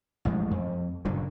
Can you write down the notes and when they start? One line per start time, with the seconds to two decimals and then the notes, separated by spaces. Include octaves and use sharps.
0.25 A1 F2 G#3
0.51 F2
1.05 F#1 G2 A#2 D3